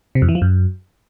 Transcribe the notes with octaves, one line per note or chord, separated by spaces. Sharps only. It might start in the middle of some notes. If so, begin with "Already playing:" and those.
C3
F2
E3
F3
F#2